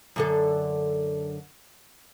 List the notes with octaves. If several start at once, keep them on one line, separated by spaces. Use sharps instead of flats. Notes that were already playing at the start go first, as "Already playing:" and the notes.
F#2 D3 A4